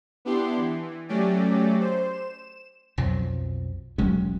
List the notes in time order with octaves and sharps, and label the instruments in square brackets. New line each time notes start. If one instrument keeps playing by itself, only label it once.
[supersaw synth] B3 D4 E4 G4 C6
E3
F#3 A3 C#4 G4 D5
C5
E7
[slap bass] B1 F2 F3 F#3
E1 F#3 G#3 C#4